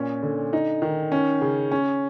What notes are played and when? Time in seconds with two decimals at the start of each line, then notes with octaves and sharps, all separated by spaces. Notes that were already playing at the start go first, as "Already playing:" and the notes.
Already playing: A#2 C#4
0.23 D3
0.53 D#4
0.82 D#3
1.12 C#4
1.41 C#3
1.72 C#4